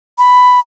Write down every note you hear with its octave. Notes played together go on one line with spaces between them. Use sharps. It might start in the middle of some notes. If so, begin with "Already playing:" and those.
B5